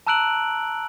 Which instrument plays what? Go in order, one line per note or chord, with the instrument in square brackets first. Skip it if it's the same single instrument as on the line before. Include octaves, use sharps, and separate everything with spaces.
[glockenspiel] A5 A#5 E6 F#6 D7 F#7